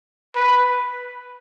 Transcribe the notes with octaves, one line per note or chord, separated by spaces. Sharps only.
B4